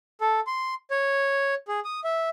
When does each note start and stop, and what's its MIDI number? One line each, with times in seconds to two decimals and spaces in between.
0.21 0.40 69
0.47 0.74 84
0.91 1.54 73
1.68 1.80 68
1.85 2.00 87
2.04 2.29 76